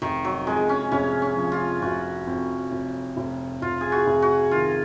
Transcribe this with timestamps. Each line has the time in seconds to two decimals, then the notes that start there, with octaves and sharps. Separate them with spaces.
0.02 F1 D#3
0.25 F#3
0.47 F2 G#3
0.69 C#4
0.92 F1 C#4
1.22 C#4
1.37 F3
1.52 F4
1.82 F1 F#4
2.27 F2
2.72 F1
3.17 F1
3.62 F1 F4
3.81 G#4
3.92 F#4
4.07 F1
4.22 F#4
4.51 D#3 F4